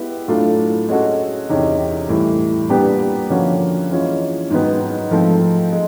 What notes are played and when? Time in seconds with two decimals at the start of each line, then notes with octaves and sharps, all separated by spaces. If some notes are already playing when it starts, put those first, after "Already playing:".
Already playing: G#3 B3 E4 G4
0.28 A2 F#3 A3 D4 F4
0.89 G#3 C#4 F#4 A4 C#5
1.49 E2 C3 D#3 G#3 C#4
2.09 A2 E3 G3
2.69 A#2 G3 B3 D4 G4
3.30 D3 F3 A#3 C#4 F#4
3.90 E3 G#3 C#4 F4
4.50 G#2 D#3 F#3 B3
5.11 G#2 F3 A3 C4
5.72 G#3